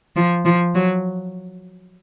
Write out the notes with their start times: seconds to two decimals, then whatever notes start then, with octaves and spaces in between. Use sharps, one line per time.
0.16 F3
0.45 F3
0.75 F#3